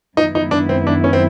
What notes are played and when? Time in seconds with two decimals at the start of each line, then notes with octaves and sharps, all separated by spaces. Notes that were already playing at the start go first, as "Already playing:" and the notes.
0.17 F#2 D#3 G#3 B3 D#4 E4
0.35 D#4
0.51 D4
0.69 C4
0.87 D4
1.04 C#4
1.13 C4